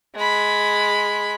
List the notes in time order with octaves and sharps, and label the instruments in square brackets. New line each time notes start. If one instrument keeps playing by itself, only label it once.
[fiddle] G#3 B5